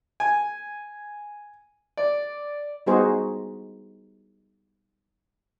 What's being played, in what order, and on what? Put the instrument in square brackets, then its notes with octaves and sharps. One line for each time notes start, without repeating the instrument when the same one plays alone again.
[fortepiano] G#5
D5
[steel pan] G3 B3 D#4 F#4 G#4 C5